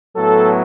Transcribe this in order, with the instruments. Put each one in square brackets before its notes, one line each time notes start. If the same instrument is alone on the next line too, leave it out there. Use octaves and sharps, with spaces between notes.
[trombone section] A2 F#3 B3 A4